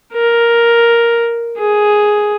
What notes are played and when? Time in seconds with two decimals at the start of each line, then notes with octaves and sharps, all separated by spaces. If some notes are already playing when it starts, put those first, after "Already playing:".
0.13 A#4
1.58 G#4